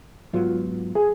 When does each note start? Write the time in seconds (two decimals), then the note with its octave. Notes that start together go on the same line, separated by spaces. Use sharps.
0.33 G#2 F#3 B3 F4
0.95 G#4